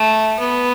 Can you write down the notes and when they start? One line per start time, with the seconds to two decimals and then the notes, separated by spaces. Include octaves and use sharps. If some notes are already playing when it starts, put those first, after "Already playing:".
Already playing: A3
0.39 B3